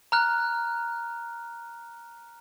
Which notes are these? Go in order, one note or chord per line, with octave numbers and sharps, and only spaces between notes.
A#5 F6 F#6